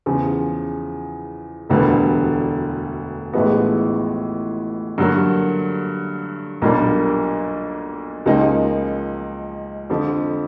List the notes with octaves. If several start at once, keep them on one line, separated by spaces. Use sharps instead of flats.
E2 C#3 F3
E1 D2 D3 G3 B3
A1 A2 F3 G#3 B3
G2 D3 F#3 A#3
B1 A#2 G3 A#3 D4
C#2 C#3 F3 A#3 D#4
F2 D3 F3